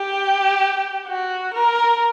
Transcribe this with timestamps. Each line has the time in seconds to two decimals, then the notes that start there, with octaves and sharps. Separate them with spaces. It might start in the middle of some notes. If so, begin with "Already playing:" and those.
Already playing: G4
1.08 F#4
1.54 A#4